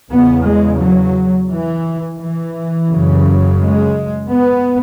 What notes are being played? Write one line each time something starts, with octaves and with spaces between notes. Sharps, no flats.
E2 C#3 B3
G#3
F#3
E3
E3
F#2 C#3
G#3
B3